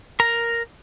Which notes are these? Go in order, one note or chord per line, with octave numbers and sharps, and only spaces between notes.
A#4 A#5